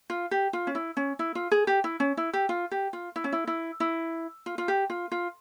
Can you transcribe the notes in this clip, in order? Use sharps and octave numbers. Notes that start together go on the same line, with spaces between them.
F4
G4
F4
C#4
E4
C#4
E4
F4
G#4
G4
E4
C#4
E4
G4
F4
G4
F4
E4
C#4
E4
E4
E4
F4
F4
G4
F4
F4